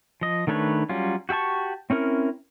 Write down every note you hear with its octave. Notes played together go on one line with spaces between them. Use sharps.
F3 D#5
D#3 A3 D4 B4 C#5
F#3 G3 C#4 F4
F#4 G4 E5 A5 C#6
C4 C#4 E4 A#4